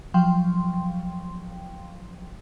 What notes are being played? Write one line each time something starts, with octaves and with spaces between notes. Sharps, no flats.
F3 F#3 F5 G5 C6